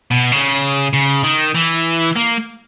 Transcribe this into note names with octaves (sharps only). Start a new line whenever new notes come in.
B2
C#3
C#3
D#3
E3
A#3